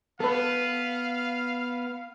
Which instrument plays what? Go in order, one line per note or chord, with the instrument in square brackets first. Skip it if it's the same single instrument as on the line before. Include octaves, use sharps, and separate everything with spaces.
[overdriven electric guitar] B3 [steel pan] A4 B4 [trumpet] F5